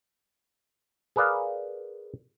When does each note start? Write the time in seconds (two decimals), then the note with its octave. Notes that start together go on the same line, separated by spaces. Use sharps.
1.16 G#4 A#4 B4 D5 F5